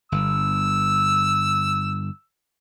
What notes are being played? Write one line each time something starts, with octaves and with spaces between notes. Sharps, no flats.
G1 E6